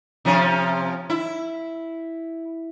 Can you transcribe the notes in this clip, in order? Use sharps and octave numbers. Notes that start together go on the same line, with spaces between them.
C3 F3 C#4
E4